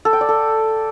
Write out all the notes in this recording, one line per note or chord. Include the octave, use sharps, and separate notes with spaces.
A4
G5
D5
A4